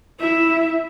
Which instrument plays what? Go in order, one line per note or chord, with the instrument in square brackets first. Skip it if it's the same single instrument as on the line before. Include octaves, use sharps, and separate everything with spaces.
[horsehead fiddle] E4 E5